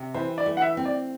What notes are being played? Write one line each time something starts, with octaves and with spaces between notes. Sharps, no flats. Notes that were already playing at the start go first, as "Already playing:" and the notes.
Already playing: C3
E3 C5
D5
A3
F#5
E5
C4
D5